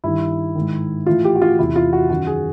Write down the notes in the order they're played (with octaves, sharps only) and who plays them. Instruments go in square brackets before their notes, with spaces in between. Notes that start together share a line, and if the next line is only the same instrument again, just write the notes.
[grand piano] G2 D#3 E4
G#2 D#3
A2 E3 F4
G4
F#4
F4
E2 C3 E3 E4
F4
F#4
F#2 D#3 F#4
G#4